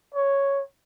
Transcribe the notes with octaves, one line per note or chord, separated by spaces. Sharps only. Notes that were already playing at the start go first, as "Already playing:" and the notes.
C#5